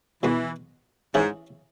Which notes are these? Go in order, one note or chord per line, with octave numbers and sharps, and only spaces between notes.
B2 E3 G#3 B3 F#4
G#2 E3 C#4 E4 G#4